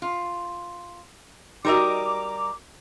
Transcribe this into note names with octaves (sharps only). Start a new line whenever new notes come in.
F4
G3 D#4 F#4 A#4 D#5 A#5 D6